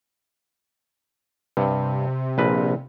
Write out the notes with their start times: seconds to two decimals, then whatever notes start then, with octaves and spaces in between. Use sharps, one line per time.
1.57 G2 C3
2.38 A#1 B4